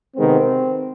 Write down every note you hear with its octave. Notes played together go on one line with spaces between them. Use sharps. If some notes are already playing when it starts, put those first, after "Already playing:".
C3 D#3 G#3 B3 C4